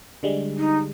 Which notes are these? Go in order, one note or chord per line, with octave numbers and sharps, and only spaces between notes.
D3 G3 G#3
D#4